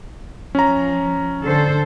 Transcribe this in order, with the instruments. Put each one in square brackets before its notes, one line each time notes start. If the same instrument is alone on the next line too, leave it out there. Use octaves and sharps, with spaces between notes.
[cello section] F3 [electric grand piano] C#4 A#5
[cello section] D3 A4 C5